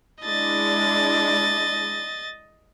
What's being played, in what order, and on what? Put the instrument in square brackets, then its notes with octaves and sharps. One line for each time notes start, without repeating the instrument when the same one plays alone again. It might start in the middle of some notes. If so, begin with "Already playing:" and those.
[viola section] G#3 D4 E4 [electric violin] D#5 A6